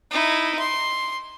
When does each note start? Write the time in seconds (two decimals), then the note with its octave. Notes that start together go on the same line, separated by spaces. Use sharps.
0.11 D#4 E4
0.59 C6